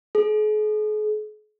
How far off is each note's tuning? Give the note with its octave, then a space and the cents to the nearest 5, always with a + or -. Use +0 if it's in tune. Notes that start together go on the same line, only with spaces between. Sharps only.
G#4 +45